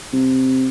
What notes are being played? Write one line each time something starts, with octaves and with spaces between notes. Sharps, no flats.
C3